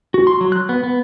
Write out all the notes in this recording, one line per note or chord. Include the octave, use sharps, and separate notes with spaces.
F#4
C6
F#3
F#6
B3
B3